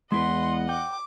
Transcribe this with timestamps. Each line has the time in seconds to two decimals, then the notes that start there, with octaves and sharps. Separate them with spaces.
0.12 E2 G#3 E4 B4 D#5 F#5 C6
0.69 G5 D6